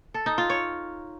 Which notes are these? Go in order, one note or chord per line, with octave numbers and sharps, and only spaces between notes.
A4
D#4
F4
C#5